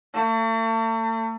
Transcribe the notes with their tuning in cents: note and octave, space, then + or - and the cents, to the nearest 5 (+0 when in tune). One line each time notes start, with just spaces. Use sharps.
A3 +40